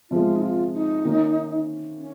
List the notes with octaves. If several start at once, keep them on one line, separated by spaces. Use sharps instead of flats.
C3 F3 G#3 F4
D#4
F4
D#4
D#3 A#3 C#4
C#4